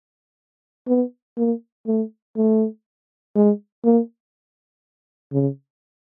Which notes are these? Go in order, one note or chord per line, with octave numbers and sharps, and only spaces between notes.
B3
A#3
A3
A3
G#3
A#3
C#3